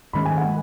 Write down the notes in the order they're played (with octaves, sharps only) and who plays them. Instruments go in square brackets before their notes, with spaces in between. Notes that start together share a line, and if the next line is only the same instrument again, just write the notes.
[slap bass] G#2 D#3 G#3 C#4 [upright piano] B5
[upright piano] G#5
F#5